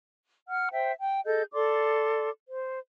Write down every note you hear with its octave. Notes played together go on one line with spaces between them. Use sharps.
F#5 F6
C5 E5 G5
G5
G#4 A4 D#5 G6
A4 D5 C6 D6
C5